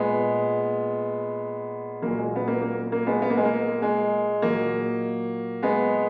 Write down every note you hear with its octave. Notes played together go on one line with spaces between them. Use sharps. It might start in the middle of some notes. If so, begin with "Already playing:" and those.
Already playing: A#2 G#3 B3
A#2 F#3 A#3
G#3
B3
A#3
A#3
A#3
G#3 B3
B3
A#3
G#3
A#3
G#3
A#2 F#3 A#3
G#3 B3